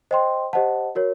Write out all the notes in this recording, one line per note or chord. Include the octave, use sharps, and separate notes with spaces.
C5 D#5 G5 C6
G4 C5 D#5 F#5 A5
F#4 A#4 C#5